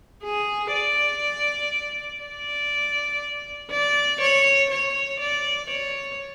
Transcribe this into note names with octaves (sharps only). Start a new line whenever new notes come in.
G#4
D5
D5
D5
C#5
C#5
D5
C#5